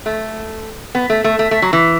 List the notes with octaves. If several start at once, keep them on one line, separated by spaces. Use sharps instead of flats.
A3
B3
A3
A3
A3
A3
F#3
E3